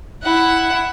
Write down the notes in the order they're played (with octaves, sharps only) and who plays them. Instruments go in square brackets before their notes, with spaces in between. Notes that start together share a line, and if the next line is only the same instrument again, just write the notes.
[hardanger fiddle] E4 F#5